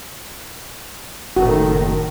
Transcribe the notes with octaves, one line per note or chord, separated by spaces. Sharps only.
F#1 A2 D#3 F#4